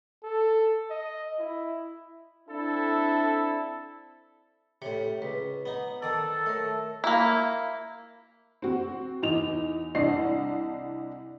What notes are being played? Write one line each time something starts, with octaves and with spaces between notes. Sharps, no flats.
A4
D#5
E4
C4 D4 E4 A4
A2 C3 C#5
C#2 B4
B3 D#4
D#3 A4 D5
A3 A#4 C#5
A#3 E4
C4 F#4
E2 D#4 F7
C2 D4 D#5 C7